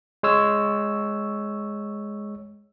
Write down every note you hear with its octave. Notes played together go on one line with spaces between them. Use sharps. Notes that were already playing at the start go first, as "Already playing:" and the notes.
G#3 C#5 E6